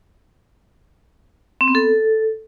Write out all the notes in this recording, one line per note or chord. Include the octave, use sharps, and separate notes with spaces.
C4
B3
A4